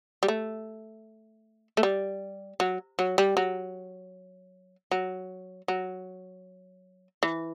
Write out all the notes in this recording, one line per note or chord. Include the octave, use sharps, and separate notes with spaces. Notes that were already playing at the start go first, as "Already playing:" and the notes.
G3
A3
A3
G3
F#3
F#3
G3
F#3
F#3
F#3
E3